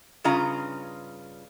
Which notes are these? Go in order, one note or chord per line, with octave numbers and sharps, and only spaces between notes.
G2 C#3 F4 D#5 A#5